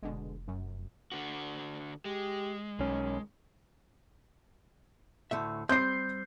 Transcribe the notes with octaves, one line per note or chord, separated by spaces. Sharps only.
F1 B2 D3 G#3
F#2
D3 F#4
G#3 G4
B1 D#3 C#4
D2 A2 E5
G3 C4 G6 C7